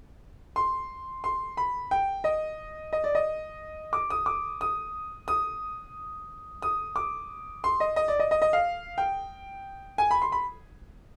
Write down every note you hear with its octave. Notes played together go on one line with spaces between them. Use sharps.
C6
C6
B5
G5
D#5
D#5
D5
D#5
D6
D#6
D6
D#6
D#6
D#6
D6
C6
D#5
D#5
D5
D#5
D#5
D#5
F5
G5
G#5
B5
C6
B5